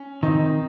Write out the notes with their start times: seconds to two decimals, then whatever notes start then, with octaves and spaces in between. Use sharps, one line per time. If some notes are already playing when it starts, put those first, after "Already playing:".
Already playing: C#4
0.22 D#3 C4 D#4